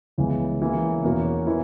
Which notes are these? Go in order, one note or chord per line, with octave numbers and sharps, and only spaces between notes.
C#2 C#3 E3 G#3 B3
C#3 E3 A#3
E2 B2 A#3 C#4 F#4
E3 B3 E4